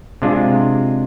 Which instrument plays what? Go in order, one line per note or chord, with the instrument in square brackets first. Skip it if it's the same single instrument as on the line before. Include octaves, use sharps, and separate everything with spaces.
[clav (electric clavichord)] C3 G#3 D4 F4